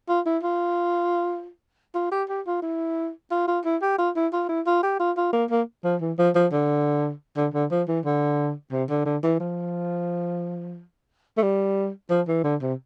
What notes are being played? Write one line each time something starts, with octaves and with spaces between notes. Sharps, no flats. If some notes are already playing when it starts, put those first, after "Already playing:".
F4
E4
F4
F4
G4
G4
F4
E4
F4
F4
E4
G4
F4
E4
F4
E4
F4
G4
F4
F4
A#3
A#3
F3
E3
F3
F3
D3
D3
D3
F3
E3
D3
C3
D3
D3
E3
F3
A3
G3
F3
E3
D3
C3